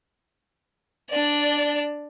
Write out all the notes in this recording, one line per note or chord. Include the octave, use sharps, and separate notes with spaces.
D4 D5